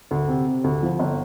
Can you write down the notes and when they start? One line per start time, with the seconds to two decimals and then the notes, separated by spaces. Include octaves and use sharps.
0.11 D2
0.28 C3
0.47 C3
0.64 D2
0.83 F3
0.99 G1